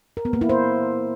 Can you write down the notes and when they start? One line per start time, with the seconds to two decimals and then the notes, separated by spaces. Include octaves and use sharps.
0.17 A#4
0.25 B3
0.33 A#3
0.41 E4
0.49 C5